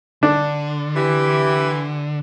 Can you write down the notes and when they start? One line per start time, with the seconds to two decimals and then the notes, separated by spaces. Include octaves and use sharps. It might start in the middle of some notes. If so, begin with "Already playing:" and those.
0.23 D3 D4
0.96 E3 G4